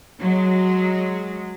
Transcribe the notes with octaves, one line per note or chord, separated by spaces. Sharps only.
F#3 G#3